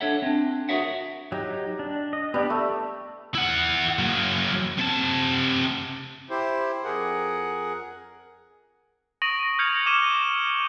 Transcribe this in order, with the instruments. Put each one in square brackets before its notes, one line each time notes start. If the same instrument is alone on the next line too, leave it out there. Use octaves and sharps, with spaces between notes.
[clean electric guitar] D4 A4 C#5 E5 F#5
C4 D4
F#4 G#4 A#4 C#5 E5 F#5
[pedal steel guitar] F#3 D#4 [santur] G4
[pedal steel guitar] D4
D#5
[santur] G3 [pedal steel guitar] B3 D4 G4
[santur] A3 [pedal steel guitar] E6
[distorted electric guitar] E4 F#5
F#3 A#3
C3 A5
[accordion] E4 G4 C5
F2 G#4 A#4 F#5
[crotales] C#6 D#6 A#6 D7 D#7 F#7
F6 G6 G#6 A#6 C#7 F7
C#6 D6 D#7 E7 G7